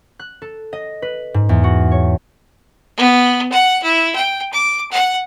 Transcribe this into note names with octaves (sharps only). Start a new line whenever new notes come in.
F#6
A4
D#5
B4
G#2
E2
F#4
C#5
B3
F#5
E4
G5
D6
F#5